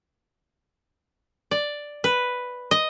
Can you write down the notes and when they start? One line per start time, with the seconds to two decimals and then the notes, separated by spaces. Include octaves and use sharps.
1.51 D5
2.04 B4
2.71 D#5